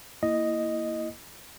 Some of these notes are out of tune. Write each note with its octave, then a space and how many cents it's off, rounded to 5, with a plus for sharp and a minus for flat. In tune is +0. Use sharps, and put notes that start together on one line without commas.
A#3 +0 E4 +0 D#5 +0